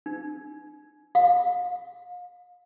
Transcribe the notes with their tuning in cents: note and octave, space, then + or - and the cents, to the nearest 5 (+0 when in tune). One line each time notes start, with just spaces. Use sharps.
D4 +45
F5 +35